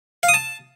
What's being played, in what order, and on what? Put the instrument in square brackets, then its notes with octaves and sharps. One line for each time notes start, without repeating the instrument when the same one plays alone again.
[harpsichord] F5
D#6
A5